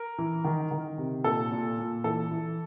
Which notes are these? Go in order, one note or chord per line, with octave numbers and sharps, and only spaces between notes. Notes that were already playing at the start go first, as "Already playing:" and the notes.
Already playing: A#4
E3
D#3
D#3
C3
A#2 A4
A#2
A#2
E3 A4
E3